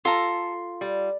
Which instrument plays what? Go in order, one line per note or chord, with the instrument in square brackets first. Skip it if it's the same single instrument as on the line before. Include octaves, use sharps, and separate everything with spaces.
[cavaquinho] F4 A#5 [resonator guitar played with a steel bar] A4
[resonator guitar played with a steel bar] G3